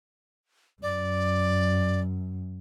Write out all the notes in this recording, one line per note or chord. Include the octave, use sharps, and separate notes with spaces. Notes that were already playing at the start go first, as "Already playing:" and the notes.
F#2 D5